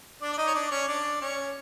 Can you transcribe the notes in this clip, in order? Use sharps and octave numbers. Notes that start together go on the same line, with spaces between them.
D4 D5
D5
D#4 D#5
C#5
D4 D5
C#4 C#5
D4 D5
C#4 C#5